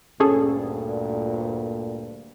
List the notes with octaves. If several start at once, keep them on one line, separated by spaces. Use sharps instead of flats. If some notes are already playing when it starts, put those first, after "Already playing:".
D2 G2 A#2 C#4 G#4 A4